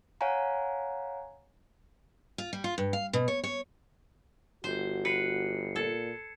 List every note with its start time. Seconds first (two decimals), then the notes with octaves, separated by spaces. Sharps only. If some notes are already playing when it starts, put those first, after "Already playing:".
0.21 C#5 F5 F#5 G#5 A#5
2.38 F4
2.53 G3
2.64 F4
2.78 G2
2.93 F5
3.13 B2
3.28 C#5
3.44 C#5
4.64 G1 F#4 C5
5.05 B4 C7 C#7
5.76 A#2 A4 G#6 C#7